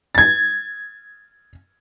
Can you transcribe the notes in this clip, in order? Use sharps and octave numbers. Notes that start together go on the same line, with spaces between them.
G#6 A6